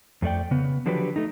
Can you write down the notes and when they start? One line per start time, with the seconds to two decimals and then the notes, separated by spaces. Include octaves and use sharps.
0.22 F2 A3 D5 G5
0.51 C#3 B3
0.86 D3 F3 F#3 D4 G4 B4
1.16 A3 D#4